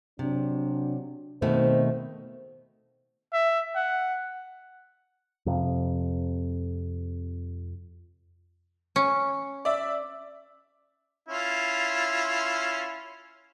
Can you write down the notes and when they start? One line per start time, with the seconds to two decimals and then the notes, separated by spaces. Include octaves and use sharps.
0.19 C3 F#3 D4
1.42 B2 D#3 A3 C4 D#4 C5
3.33 E5
3.75 F#5
5.46 F2 C3
8.96 C#4
9.65 D5 E5
11.29 C#4 E4 F4